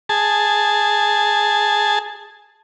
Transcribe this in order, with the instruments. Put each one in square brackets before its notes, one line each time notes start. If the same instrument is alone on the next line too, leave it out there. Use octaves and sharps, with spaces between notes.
[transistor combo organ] G#4 A5